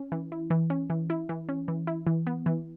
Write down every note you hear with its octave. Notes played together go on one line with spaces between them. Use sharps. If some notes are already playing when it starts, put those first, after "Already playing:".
Already playing: C#4
E3
E4
E3
C#4
E3
E4
E3
C#4
E3
E4
E3
B3
E3